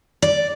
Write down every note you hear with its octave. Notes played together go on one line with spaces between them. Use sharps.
D5